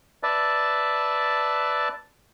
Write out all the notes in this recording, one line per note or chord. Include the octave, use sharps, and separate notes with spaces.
B4 D5 E5 A5